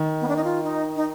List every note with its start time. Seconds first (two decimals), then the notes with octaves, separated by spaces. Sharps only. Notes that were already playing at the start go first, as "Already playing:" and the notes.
Already playing: D#3
0.21 B3
0.28 D4
0.36 D#4
0.44 F4
0.64 D#4
0.96 D#4